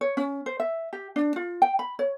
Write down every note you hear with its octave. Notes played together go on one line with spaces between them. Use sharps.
C#5
C#4
C5
E5
G4
D4
F4
G5
B5
C#5